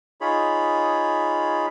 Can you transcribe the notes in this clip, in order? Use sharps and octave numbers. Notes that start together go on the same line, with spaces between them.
D#4 F4 G#4 C#5 B5